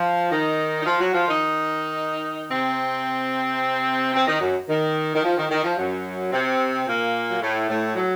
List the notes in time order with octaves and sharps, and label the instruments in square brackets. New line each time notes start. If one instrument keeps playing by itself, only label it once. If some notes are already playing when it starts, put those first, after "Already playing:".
Already playing: [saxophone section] F3
D#3 D#4
D#4
F3 F4
F#3 F#4
F3 F4
D#3 D#4
C3 C4
C3 C4
D#3 D#4
F#2 F#3
D#3
D#3
F3
D#3
D#3
F3
F#2 F#3
C3 C4
A#2 A#3
F#3
A2 A3
A2 A3
F#3